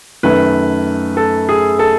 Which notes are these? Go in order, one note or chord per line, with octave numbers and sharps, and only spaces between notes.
F#2 D#3 A3 B4
A4
G#4
A4